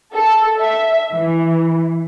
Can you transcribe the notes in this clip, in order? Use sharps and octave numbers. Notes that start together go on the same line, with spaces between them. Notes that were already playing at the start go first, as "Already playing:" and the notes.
A4
E5
E3